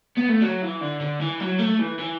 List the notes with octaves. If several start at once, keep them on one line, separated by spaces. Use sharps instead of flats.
B3
A3
F#3
E3
D3
D3
E3
F#3
A3
E3
E3